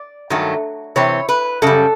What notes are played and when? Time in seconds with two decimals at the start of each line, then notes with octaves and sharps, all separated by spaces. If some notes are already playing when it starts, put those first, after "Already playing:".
Already playing: D5
0.30 G2 D#3 F#3 A3
0.96 C3 E3 C4 C#5
1.29 B4
1.62 F#2 C#3 G3 A4